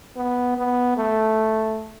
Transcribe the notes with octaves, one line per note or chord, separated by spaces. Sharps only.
B3
B3
A3